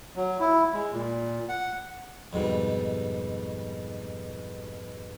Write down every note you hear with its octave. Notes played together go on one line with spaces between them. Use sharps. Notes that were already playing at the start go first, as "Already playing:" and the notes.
F#3
E4
G#3
A#2
F#5
F2 G#2 B2 G3